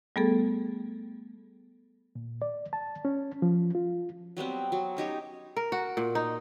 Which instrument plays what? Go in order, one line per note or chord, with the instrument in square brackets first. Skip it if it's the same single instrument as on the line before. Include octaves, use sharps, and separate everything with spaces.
[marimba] G3 A3 B3 G#4 A4
[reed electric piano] A#2
D5
A5
C#4
F3
F4
[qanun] F#3 G3 B3 C4
F#3
C#4 D#4 G4 C#5
[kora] A#4
F#4
A#2
D#4